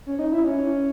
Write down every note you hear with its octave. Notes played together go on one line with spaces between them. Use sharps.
C#4
D#4
E4
C#4